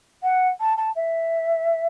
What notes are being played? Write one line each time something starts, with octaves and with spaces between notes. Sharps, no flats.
F#5
A5
A5
E5